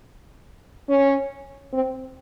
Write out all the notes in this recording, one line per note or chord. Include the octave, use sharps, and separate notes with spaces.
C#4
C4